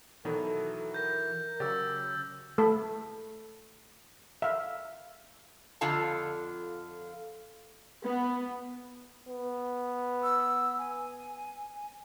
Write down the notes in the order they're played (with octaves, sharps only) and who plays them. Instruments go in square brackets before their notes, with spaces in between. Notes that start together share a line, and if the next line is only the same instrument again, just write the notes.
[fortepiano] B2 D#3 F#3 [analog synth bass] E3 [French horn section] A4
[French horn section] A#4 [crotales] G6 A#6
[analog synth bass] C#3 [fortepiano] F#3 G4 [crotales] E6 A6
[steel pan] A3 A4 B5
E5 F5
[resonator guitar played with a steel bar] F2 D3 F4 F5 A5
[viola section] B3
[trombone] B3
[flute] E6
G#5